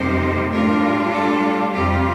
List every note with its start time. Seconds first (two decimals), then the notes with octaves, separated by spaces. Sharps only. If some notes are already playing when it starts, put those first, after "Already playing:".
Already playing: F2 C3 G3 A#3 D#4 C5
0.51 A2 G3 D4 F4 A#4
1.12 A4
1.72 F2 C3 G3 C4 F4 G4